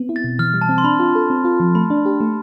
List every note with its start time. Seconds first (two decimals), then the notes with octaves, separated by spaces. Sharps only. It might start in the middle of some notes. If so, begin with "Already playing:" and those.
Already playing: B3 C4
0.09 E4
0.16 A6
0.24 B2
0.39 E3 F6
0.54 G3
0.61 A5
0.69 C4
0.78 C6
0.84 D4 B5
0.99 F4
1.15 A4
1.30 C4
1.45 F4
1.60 F3
1.75 A3 B5
1.90 D4
2.06 G4
2.21 A3